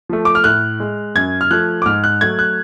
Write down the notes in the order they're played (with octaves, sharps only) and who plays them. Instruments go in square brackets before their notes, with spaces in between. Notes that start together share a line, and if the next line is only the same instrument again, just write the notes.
[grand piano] F3 A3
D6
F6
A2 F#6
G#3
F#2 G#6
F6
F3 A3 F#6
D6
G#2 F6
F#6
F#3 A3 G#6
F#6